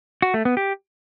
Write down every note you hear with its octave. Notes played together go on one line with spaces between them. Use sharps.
F#4
A3
B3
G4